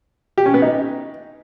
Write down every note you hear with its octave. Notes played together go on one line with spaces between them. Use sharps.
G4
C#4
B3
D#4